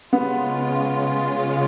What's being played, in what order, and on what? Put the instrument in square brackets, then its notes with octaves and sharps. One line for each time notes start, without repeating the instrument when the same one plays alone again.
[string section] C#3 G#3 C#4 F4 [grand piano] B3